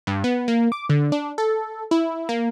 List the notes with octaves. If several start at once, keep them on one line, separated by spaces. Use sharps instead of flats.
G2
B3
A#3
D6
D3
D4
A4
E4
A#3